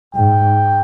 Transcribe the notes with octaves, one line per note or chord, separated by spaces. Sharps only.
G#2 G5